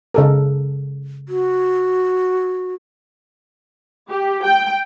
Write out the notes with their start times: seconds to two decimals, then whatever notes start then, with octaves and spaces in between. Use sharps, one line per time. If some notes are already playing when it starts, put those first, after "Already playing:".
0.14 C#3 A4 A#4
1.29 F#4
4.11 G4
4.44 G5